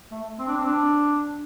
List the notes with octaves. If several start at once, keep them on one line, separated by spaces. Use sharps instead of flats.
A3
C4
D4
C4
D4